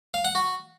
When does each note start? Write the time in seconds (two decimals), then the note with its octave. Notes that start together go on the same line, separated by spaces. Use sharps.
0.14 F5
0.25 F#5
0.35 F#4